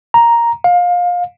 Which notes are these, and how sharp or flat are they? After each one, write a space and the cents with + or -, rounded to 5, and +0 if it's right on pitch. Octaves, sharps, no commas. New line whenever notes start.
A#5 +5
F5 +25